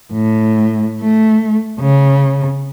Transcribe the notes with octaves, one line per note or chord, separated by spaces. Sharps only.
A2
A3
C#3